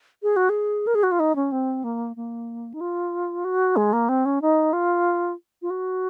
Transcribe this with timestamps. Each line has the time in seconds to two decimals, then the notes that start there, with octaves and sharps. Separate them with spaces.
0.23 G#4
0.36 F#4
0.49 G#4
0.87 A#4
0.95 G#4
1.03 F#4
1.12 F4
1.20 D#4
1.36 C#4
1.52 C4
1.84 A#3
2.16 A#3
2.74 D#4
2.81 F4
3.45 F#4
3.76 G#3
3.93 A#3
4.09 C4
4.25 C#4
4.42 D#4
4.73 F4
5.62 F4
5.70 F#4